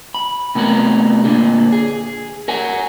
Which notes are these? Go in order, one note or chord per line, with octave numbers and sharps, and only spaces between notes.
B5
C3 A3 B3 A#4 B5
A#2 D3 D4
G#4
A#4 F#5 G#5